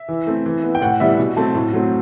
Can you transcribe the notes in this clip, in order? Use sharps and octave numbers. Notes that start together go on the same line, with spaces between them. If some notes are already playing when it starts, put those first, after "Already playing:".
Already playing: E5
E3
A3 C4
E3
B3
G5
A2 F#5
E3 G3 B3 E5
B2
F#3 A3 C4 A5
A2
F#3 A3 C4